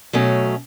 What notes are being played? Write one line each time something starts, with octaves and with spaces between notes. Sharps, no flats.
B2 F#3 A3 C#4